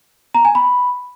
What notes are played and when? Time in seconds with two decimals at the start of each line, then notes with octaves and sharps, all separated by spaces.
0.35 A#5
0.45 G#5
0.55 B5